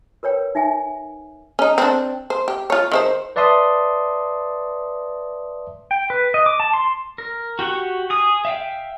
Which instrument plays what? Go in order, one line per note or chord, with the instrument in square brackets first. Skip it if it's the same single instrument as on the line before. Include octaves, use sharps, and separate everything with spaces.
[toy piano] A#4 B4 C#5 G5
D#4 E5 G5 G#5
[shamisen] C#4 D#4
C4 D4
C5
G4
F4 C#5
D#3 E4 C5
[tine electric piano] B4 D5 E5 A5 C6 D#6
[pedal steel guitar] G5
B4
D#5
D6
A5
C6
A#4
F#4 G4 F#5 C#6
G#4 D#6
E5 F5 G5